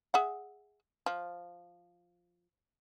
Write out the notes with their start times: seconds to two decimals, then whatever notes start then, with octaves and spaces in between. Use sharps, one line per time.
0.14 G#4 E5 F#5
1.06 F3